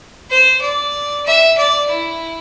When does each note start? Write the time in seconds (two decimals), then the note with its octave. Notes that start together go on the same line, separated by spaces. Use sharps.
0.30 C5
0.62 D5
1.26 E5
1.58 D5
1.90 E4